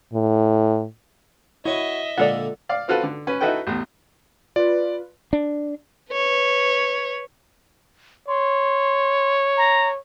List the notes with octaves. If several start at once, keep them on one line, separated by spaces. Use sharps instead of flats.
A2
E4 F#4 C#5 D#5 E5 G#5
A#2 D3 G#3 A#3 F4 A4 D5 F#5
D5 F5
C4 F4 F#4 A4 B4
D3
C#4 B4
D#4 E4 F#4 A4 B4 G5
A1 E2
F4 B4 D5
D4
B4 C#5
C#5 C6
A#5